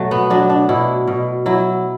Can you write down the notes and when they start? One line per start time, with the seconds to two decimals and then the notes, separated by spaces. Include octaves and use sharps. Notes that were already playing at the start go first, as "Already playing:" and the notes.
Already playing: B2 F#3 A3
0.11 B3
0.30 F#3 D4
0.50 D4
0.69 B2 E4
1.08 B2
1.46 F#3 E4